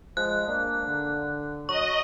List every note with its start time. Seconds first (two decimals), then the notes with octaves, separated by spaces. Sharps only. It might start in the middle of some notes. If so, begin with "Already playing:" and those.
0.17 F3 G#3 F#6
0.48 A#3 D4
0.87 D3
1.69 F#3 D#5 C#6